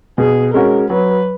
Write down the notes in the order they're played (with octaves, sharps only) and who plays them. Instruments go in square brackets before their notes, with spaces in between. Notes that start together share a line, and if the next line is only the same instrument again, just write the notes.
[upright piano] B2 [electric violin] G#4
[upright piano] G#3 C#4 F#4 [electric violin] A#4
[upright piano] F#3 [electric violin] B4